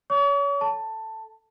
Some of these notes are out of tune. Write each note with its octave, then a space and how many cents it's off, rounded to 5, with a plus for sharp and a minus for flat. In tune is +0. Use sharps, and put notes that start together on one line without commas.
C#5 +30 C#6 +45
A4 +0 A5 +10